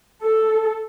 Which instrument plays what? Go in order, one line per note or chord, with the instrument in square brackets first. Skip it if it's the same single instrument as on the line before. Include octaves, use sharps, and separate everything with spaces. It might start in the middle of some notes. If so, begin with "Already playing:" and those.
[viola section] A4